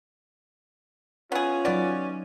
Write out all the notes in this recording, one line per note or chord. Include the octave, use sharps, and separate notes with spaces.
B3 C#4 F4 G#4
F#3 B3 D#4 D5 D#5